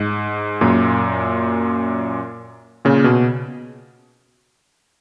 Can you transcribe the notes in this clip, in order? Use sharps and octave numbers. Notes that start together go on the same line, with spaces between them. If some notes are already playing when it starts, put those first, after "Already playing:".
Already playing: G#2
F#2 A#2
A#2 C#3
B2